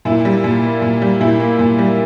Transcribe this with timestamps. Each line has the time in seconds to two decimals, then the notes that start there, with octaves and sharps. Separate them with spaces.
0.05 A#2 E4
0.25 G3
0.44 A#2
0.63 A#3
0.82 A#2
1.02 G3
1.21 A#2 E4
1.40 A#3
1.59 A#2
1.79 G3